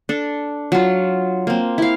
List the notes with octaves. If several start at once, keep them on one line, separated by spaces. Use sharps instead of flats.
D4 A4
F#3 F4
A#3 C4
E4 F5